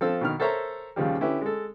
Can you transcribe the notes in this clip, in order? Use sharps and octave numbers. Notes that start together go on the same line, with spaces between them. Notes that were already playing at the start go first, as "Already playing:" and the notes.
F3 C4 A4 E6
B2 D#3 F6
A4 A#4 C5 C#5 E5 A#5
D#2 C#3 F3 G3
D3 C#4 E4 G4 B4
G#3 A4